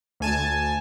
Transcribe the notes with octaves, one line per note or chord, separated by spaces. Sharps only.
D2 G#5 A5